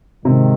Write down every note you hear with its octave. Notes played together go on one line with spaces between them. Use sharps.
G#2 C3 D#3